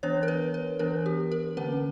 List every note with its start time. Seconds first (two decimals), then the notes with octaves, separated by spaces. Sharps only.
0.03 E3 B3 D4 C#5
0.23 A#4
0.28 B4
0.54 B4
0.79 E3 B3 D4 A#4
1.06 G4
1.32 A#4
1.57 D3 A#3 C#4 B4